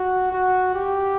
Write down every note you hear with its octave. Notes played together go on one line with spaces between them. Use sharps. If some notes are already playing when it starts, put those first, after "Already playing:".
Already playing: F#4
F#4
G4